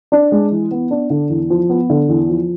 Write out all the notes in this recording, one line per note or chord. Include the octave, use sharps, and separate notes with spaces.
D4
G#3
E3
B3
D4
D3
E2
F3
B3
D3
E2
F3